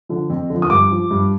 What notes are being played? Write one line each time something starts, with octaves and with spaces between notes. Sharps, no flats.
D3 F3
F2
D3 F3
D#6
G2 D6
F3
G2